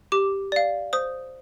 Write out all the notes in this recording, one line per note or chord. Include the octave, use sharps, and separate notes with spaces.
G4 D6
D5 F5
C5 D#6